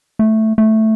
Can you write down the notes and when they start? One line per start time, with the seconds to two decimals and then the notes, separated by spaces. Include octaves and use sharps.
0.19 A3
0.58 A3